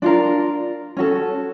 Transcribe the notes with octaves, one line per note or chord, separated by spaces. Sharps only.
D4 F4 A#4 D5
C#4 F#4 A4